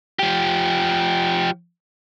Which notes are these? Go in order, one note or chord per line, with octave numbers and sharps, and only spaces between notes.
F3 G4